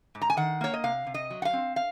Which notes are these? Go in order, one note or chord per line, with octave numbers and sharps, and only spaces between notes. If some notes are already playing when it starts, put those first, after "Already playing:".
G#2
A#5
G#5
D#3 F#5
A#3 C#5
D#5
C3 F5
C3
D#5
F#3
F#5
F5
C4
F5